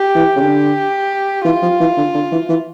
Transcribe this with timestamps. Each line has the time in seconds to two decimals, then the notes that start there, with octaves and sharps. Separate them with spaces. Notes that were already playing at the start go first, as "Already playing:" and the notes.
Already playing: G4
0.15 E3
0.36 C#3
0.41 D3 G4
1.45 E3 F4
1.62 F3
1.80 E3
1.97 D3
2.14 D3
2.32 E3
2.49 E3